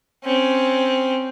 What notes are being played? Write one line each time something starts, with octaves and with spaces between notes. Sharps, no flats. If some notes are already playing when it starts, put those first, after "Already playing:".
C4 C#4